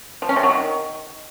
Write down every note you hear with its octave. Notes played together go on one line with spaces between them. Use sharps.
F3
C#4
C3
F#3
D#3